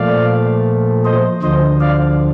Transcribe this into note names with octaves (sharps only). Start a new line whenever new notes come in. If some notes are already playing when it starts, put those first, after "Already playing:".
Already playing: A#2 F3 A3 D5 F5
C5 D#5
D2 D3 F3 C5 D#5
D5 F5